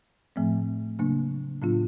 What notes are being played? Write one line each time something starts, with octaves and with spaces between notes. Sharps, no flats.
A2 F3 A3 C4
C#3 F#3 A#3 D4
A2 F#3 B3 D4 F4